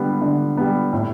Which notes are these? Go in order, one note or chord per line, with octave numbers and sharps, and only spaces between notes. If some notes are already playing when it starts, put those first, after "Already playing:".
Already playing: D3 G3 B3
D3
G3 B3
A2